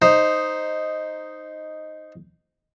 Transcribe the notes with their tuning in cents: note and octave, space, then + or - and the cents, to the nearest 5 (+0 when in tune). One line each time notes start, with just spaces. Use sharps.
D#4 +0 C5 +0